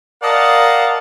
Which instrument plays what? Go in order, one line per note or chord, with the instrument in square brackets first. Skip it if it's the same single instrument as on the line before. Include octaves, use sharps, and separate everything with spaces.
[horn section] A#4 D5 D#5 F5 F#5 A5